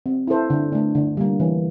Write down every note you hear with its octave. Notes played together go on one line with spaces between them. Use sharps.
C4
E4 A4 C5
D3
A3 D4
D3
G3 A#3
E3